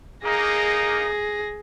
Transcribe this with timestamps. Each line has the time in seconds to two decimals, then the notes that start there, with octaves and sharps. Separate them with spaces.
0.24 A#3 D#4 G#4 A#6